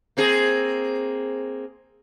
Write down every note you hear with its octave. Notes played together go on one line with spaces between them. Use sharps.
A#3 C4 G#4